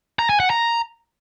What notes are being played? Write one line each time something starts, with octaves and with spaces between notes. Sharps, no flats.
A#5
G#5
F#5
A#5